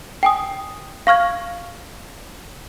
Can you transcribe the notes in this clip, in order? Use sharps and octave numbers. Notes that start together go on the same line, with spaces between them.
G5 G#5 D#6
F5 C#6 F6 G#6